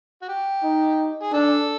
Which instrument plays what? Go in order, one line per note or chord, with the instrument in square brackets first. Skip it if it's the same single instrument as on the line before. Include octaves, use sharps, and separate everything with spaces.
[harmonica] F#4
G4
[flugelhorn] D#4
[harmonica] G#4
[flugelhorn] D4 [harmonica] A4